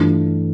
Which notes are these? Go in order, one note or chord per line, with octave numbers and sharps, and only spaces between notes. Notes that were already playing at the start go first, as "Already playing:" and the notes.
Already playing: G2 E3 A3 D4 F4